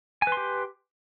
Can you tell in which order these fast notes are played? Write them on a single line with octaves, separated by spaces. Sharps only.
G#5 B4 C6 G4